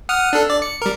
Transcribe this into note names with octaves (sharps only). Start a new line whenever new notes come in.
F#5 D#6 F6
D4 A4
D5
C#7
G3 A#4